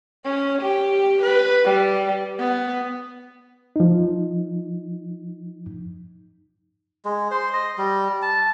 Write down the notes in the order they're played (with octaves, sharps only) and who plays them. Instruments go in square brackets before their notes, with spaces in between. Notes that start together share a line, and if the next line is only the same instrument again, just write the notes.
[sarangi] C#4
G4
B4
G3
B3
[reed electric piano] F3 D#4
[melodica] G#3
C5
D#5
G3
A5